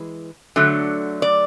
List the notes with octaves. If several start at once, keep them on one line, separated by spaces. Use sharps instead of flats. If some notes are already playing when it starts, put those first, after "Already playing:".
Already playing: E3 G#3
D3 F#3 A3
D5